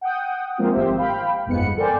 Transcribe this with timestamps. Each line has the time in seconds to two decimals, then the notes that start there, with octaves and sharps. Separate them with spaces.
0.01 F#5 G5 D#6
0.58 F3 G#3 A#3 C4 D#4 F4
0.72 G#1 G4 C5 E5
0.98 F5 G5 B5
1.46 G1 F2 G#2 B3 B4 C#7
1.77 A4 A#4 C5 D5 G5 G#5